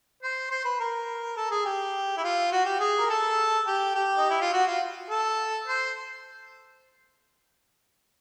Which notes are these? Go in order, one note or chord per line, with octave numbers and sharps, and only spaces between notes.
C5
C5
B4
A#4
A4
G#4
G4
E4
F4
F#4
G4
G#4
A#4
A4
G4
G4
D#4
E4
F4
F#4
F4
A4
C5